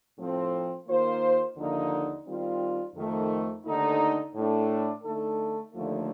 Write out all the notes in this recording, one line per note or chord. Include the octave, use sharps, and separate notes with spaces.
A2 F3 A3 C4
D#3 A#3 F4 C5
D#2 D3 F3 A#3 D#4
D#3 G3 C4 F4
F2 D#3 A3
D#2 D3 A3 D#4
A2 A3 D4
D3 A3 D#4 A4
D#2 D3 F3 A3